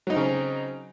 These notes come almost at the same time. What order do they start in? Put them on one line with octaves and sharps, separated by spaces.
F#3 D#4 C4 C#3